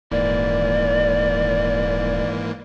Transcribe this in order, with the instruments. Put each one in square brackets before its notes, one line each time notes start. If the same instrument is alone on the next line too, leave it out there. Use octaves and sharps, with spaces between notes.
[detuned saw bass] D#1 [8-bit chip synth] G#2 E3 A#3 [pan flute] D5